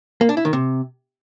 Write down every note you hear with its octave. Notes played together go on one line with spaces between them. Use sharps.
A#3
D4
E4
D#3
C3